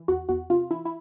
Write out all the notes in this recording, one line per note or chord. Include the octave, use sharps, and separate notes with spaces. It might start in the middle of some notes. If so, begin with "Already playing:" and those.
Already playing: E3
E2 F#4
E2 F#4
C3 F4
E3 E4
E4